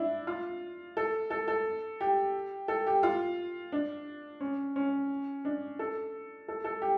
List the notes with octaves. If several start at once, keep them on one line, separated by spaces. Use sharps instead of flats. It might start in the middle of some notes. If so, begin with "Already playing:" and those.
Already playing: D4 E4
F4
A4
A4
A4
G4
A4
G4
F4
D4
C#4
C#4
D4
A4
A4
A4
G4